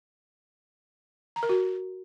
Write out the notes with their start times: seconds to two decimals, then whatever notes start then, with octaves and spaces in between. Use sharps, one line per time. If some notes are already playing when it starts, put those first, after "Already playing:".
1.36 A#5
1.43 A#4
1.49 F#4